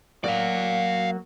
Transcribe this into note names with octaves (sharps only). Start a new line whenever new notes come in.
F#3 A#3 F#4 D5 F5